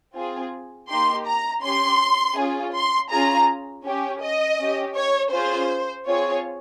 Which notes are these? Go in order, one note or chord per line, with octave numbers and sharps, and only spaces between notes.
C4 F4 G#4
A#3 D#4 G4 C6
A#5
C#4 G4 C6
C#4 F4 G#4
C6
C#4 F4 G#4 A#5
C#4 G4
D#5
C#4 G4
C#5
C#4 F4 G#4 C5
C4 F4 G#4 C#5